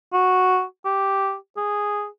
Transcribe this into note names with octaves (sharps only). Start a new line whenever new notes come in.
F#4
G4
G#4